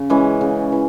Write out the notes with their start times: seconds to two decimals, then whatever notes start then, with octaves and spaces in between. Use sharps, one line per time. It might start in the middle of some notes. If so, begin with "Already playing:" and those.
Already playing: C#3
0.10 E3 G#3 C#4
0.41 C#3
0.72 E3